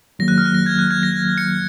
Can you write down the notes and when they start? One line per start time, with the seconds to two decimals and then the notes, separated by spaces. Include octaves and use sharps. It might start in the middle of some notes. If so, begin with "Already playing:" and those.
0.19 D#3 F#3 A#3 A#6
0.28 F#6
0.38 F6
0.45 F#6
0.54 A#6
0.66 G#6
0.79 F#6
0.91 G#6
1.03 A#6
1.38 C#7